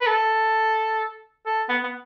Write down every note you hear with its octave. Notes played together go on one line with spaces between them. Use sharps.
B4
A4
A4
B3
B3